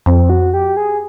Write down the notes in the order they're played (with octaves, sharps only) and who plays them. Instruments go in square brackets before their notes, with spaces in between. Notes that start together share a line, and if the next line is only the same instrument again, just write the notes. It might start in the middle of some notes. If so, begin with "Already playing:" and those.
[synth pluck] F2 [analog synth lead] C4
[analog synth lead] F#4
G4
G#4